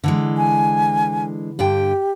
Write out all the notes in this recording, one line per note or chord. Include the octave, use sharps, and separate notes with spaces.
D3 E3 G#3
G#5
G2 D3 G4 G5